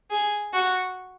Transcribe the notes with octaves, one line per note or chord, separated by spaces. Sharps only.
G#4
F#4